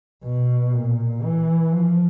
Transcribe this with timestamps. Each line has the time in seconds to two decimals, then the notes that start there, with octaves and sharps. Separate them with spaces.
0.24 B2
0.73 A#2
1.24 E3
1.72 F3